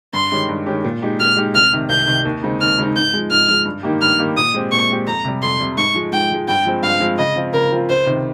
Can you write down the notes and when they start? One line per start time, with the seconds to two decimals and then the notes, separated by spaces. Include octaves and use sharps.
0.13 G2 C6
0.32 D#3 G#3 C#4 G4
0.49 G2
0.66 D#3 G#3 C#4 G4
0.84 A#2
1.02 G#3 D#4 G4
1.20 A#2 F6
1.37 G#3 D#4 G4
1.54 C2 F6
1.73 C3 D#3
1.89 C2 G6
2.07 C3 D#3
2.25 D#2
2.43 C#3 G#3 C4 D#4
2.61 D#2 F6
2.79 C#3 G#3 C4 D#4
2.96 G#2 G6
3.14 F3 G#3
3.31 G#2 F6
3.49 F3 G#3
3.65 G2
3.83 D#3 A#3 D#4 G4
4.01 G2 F6
4.19 D#3 A#3 D#4 G4
4.37 A#2 D#6
4.54 G#3 C4 G4
4.72 A#2 C#6
4.89 G#3 C4 G4
5.07 F2 A#5
5.24 C3 G3
5.42 F2 C6
5.60 C3 G3
5.77 G#2 C#6
5.94 F3 G#3
6.12 G#2 G5
6.31 F3 G#3
6.48 G2 G5
6.65 F3 G#3 C4
6.83 G2 F5
7.00 F3 G#3 C4
7.18 C#3 D#5
7.36 F3 C4 F4
7.53 C#3 A#4
7.71 F3 C4 F4
7.89 C#2 C5
8.06 C3 D#3